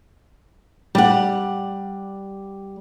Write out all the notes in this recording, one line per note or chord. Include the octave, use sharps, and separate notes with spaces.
G3 F#5